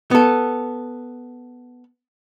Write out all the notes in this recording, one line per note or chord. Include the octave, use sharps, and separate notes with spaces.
B3 A4